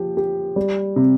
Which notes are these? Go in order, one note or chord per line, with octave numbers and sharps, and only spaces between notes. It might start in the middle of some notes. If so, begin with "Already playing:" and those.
Already playing: F3 G4
G4
G3
C3